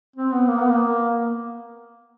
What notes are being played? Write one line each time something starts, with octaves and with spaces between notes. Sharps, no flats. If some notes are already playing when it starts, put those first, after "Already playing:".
C4
B3
A#3
B3
A#3